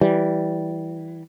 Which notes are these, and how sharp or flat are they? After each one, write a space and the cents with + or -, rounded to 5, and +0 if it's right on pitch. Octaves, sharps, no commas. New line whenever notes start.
E3 +0 G3 -15